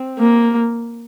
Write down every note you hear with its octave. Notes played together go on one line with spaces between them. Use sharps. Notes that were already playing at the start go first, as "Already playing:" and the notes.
Already playing: C4
A#3